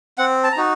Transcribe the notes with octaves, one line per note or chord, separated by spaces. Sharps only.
C4 F#5
A5
A#5
D#4 F#4